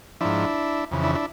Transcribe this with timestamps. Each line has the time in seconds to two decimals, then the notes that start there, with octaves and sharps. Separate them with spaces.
0.21 G#2 F3 D4 E4
0.91 F2 C#3 E3
1.03 D4 E4
1.15 D4 E4